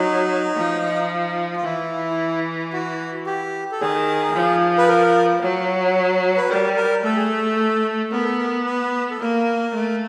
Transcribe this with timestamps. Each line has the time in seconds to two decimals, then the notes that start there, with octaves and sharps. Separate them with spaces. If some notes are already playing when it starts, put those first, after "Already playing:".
Already playing: F#3 D#4
0.57 F3
1.56 F4
1.64 E3 E4
2.73 F#4
3.26 G4
3.72 A4
3.80 D#3 G#4
4.35 F3
4.78 B4
4.88 A#4
5.42 F#3
6.37 B4
6.50 G3 A#4
6.76 A#4
7.04 A3 A4
7.16 G#4
7.28 A4
8.12 B3 A#4
8.24 A4
8.38 A#4
8.66 B4
9.11 A4
9.20 A#3 A#4
9.74 A3